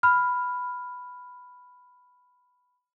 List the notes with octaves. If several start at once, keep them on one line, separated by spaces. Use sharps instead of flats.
B5 F6